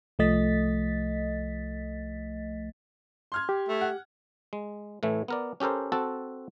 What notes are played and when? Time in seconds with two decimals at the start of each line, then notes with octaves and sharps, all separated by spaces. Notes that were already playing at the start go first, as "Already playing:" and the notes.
0.19 C2 F3 A3 D#5 A6 B6
3.32 C6 F6 G#6
3.49 G4
3.69 A3
3.81 F#5
4.53 G#3
5.03 A2 E3 A3
5.28 B3 A#4 D5
5.60 C#4 G4 A4 A#4 C5
5.92 C4 F#4 A4 A5